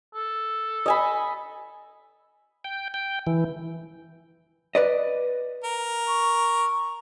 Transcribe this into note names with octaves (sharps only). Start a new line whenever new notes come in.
A4
D#5 G#5 B5
G5
G5
E3
B4 D5 D#5
A#4
C#6